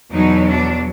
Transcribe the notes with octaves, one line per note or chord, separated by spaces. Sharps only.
E2 B2 F#3 D#4
D4